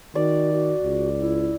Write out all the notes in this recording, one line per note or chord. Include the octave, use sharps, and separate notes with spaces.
D#3 F#4 D5
F#4
C#2
E4